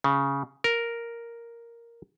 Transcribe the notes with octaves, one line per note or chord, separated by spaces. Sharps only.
C#3
A#4